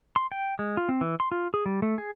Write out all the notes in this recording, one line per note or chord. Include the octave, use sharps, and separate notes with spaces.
C6
G5
G#3
F4
C4
E3
C6
F4
G#4
G3
A3
G#4